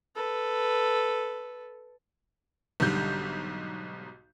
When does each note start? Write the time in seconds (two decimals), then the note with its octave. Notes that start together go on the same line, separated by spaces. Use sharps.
0.15 A4 B4
2.80 B1 G#2 D3 G3 G6